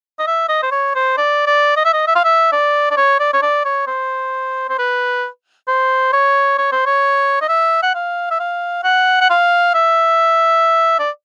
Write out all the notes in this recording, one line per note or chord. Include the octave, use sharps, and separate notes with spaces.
D#5
E5
D#5
C5
C#5
C5
D5
D5
D#5
E5
D#5
E5
F5
E5
D5
D5
C#5
D5
C#5
D5
C#5
C5
C5
B4
C5
C#5
C#5
C5
C#5
D#5
E5
F#5
F5
E5
F5
F#5
F#5
F5
E5
D5